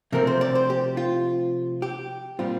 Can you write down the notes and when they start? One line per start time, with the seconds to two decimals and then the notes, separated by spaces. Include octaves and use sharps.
0.12 C3 F3 A3 C4 A#4
0.27 C5
0.41 D5
0.55 C5
0.70 G4
0.97 F4
1.82 G4
2.39 A#2 G3 C4 F4